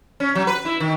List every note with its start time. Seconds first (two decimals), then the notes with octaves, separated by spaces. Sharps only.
0.20 C#4
0.35 F#3
0.47 B4
0.65 E4
0.80 D#3